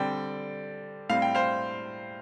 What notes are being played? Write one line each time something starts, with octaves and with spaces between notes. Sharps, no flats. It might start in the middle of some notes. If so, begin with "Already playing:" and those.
Already playing: D3 G3 C4 D5 G5
A2 G3 C4 F5
G5
C5 F5